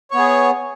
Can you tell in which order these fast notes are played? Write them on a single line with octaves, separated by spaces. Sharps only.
C#5 B3 G#4